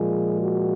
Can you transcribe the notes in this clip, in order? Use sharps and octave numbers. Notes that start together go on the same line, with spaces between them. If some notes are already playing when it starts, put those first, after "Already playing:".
Already playing: A#2 F3 G#3 G#4
F#4